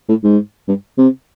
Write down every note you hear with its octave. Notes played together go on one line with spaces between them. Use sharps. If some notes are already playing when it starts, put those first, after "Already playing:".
A2
G#2
G2
C3